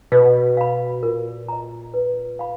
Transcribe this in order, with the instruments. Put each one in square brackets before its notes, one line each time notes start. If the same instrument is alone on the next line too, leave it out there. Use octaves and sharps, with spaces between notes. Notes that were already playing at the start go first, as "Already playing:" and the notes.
[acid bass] B2 [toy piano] B4
[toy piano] F5 B5
[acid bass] A#2 [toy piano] A#4
[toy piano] D#5 A#5
B4
F5 B5